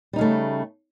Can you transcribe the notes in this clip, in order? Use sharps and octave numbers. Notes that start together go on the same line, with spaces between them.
C#3 G3 A3 D#4